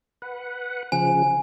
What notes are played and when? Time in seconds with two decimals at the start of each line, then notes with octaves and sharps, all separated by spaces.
0.22 B4 F#5
0.92 C#3 F3 G#5